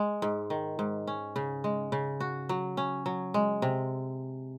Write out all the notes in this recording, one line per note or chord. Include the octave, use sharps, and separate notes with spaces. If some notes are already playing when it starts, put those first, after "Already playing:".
Already playing: G#3
G#2
D#3
G#2
C#4
C#3
G#3
C#3
F#4
F#3
C#4
F#3
G#3
C3